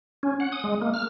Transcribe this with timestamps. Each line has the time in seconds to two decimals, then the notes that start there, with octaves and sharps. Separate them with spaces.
0.23 C#4
0.40 F#5
0.52 D#6
0.64 G#3
0.81 A#3
0.94 F6